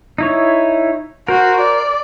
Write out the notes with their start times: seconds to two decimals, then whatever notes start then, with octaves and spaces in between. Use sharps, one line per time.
0.18 D#4 E4 C#5
1.28 F#4 A#4 C5
1.60 D5